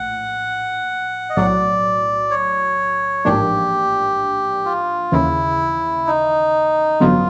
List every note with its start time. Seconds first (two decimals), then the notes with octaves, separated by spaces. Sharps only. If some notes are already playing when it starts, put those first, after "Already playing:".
Already playing: A#1 A2 F#5
1.30 D#5
1.36 B1 A2 F#3 D5
2.31 C#5
3.25 A1 G#2 F3 A#3 D4 G4
4.65 F4
5.12 D#2 C#3 E3 E4
6.07 D#4
7.00 A1 G2 D3 F#3 B3 F4